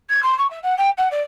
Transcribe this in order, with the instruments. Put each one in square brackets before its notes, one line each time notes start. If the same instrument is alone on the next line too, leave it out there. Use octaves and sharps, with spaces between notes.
[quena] G#6
C6
C#6
E5
F#5
G5
F#5
D5